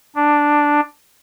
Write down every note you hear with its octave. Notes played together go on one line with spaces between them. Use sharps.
D4